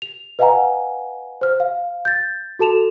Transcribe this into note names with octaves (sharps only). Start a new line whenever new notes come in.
F7
B4 D#5 F5 F#5 G#5 A#5
C5 F6
F5
G6 A6
F#4 A4 A5 E7 F7